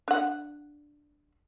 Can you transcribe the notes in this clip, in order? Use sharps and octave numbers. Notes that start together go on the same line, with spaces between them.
D4 F#5